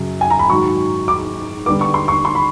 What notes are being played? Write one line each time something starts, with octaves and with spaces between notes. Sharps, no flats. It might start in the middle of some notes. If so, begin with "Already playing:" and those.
Already playing: F#2 C#3 F#3
G#5
A#5
B5
G#2 D#3 F#3 C#6
D6
D3 G3 B3 D6
C#6
C6
C#6
C6
B5